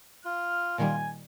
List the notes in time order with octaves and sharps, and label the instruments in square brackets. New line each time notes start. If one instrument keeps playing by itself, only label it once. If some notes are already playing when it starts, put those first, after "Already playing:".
[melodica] F4 [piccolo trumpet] F6
[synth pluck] A#2 D#3 G3 [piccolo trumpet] G#5